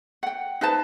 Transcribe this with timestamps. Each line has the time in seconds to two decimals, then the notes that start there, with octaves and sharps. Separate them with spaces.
0.23 F#5 G5
0.61 D#4 B4 C5 A5